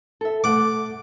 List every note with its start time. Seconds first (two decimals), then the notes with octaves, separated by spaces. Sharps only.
0.21 A4 E5
0.44 A3 F#5 D6